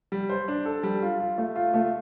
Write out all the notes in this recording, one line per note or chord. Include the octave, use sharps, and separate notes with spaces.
G3
C5
D4
A4
G3
F4
F4
A3
F4
A3